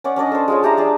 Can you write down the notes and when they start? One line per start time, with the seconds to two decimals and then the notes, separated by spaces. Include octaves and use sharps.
0.04 C#4 D5 F#5
0.16 C#4 D4 D5 D#5
0.32 A4 C5
0.48 G#3 F4 C#5
0.63 D4 G4 E5 A#5
0.77 D4 G#4 D5